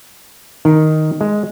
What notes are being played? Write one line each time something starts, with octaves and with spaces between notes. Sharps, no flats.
D#3
G#3